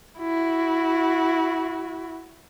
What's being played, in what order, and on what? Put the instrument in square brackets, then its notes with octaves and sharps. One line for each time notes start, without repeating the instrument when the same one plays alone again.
[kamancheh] E4 F#4